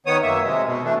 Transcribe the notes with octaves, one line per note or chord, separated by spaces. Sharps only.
D#3 B3 C#5 D#6
F#2 A#3 E5
C3 G#3
B2
E3 A3 D4